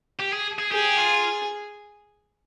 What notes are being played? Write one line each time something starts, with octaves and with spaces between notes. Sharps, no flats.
G4
G#4
G#4
G4 G#4
F4